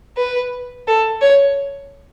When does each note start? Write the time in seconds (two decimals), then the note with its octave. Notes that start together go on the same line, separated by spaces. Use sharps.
0.17 B4
0.87 A4
1.21 C#5